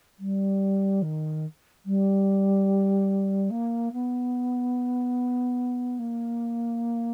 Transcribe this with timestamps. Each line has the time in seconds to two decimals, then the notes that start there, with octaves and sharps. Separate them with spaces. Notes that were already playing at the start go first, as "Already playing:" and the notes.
0.19 G3
1.02 D#3
1.86 G3
3.50 A#3
3.93 B3
5.99 A#3